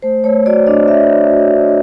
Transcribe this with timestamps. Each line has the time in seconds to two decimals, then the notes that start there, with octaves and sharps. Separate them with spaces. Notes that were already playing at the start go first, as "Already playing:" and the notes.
0.02 A3 C5
0.24 A3 C#5
0.46 F#4 D5
0.67 D4 D#5
0.88 A3 E5
1.09 A3
1.30 F#4
1.52 D4